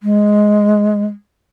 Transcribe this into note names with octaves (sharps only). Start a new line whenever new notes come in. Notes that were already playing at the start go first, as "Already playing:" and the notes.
G#3